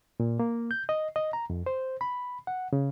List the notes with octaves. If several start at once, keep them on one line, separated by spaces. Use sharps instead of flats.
A#2
A#3
G6
D#5
D#5
A#5
F2
C5
B5
F#5
C#3